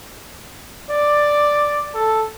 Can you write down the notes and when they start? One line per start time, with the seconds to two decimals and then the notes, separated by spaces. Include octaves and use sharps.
0.90 D5
1.94 A4